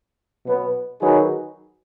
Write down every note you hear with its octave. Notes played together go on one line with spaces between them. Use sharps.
B2 F#3 B3
D#3 F#3 D#4 G#4 B4